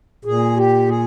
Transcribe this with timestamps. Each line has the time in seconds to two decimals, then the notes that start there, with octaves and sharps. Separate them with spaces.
0.25 A#2 G#4
0.57 G4
0.88 G#4